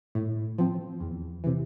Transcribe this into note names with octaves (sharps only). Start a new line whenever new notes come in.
A2
F3 C4
E2
C3 E3